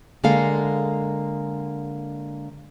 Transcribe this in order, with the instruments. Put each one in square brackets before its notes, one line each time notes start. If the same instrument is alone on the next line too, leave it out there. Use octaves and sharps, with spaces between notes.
[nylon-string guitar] D3 G#3 A#3 A4 F5